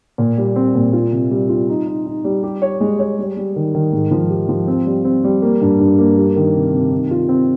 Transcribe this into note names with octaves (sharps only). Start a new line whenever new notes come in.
A#2
G3
C4
A#2
F4
C3
G3
F4
D#4
D#4
D#4
G3
G4
C#5
G#3
C#5
G3
G3
D#3
D#3
G#2
F3
G4
F3
C4
G3
C4
G3
A#3
G2
G2
A#3
G3
D#3
C3
C3
D#3
F4
C4